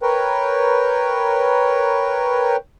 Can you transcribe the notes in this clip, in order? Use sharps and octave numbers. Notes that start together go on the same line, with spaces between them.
A#4 B4 C#5 G5